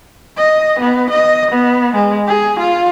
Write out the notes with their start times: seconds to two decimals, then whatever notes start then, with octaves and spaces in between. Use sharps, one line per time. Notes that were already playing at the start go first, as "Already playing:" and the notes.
0.37 D#5
0.79 B3
1.10 D#5
1.51 B3
1.95 G#3
2.28 G#4
2.59 F4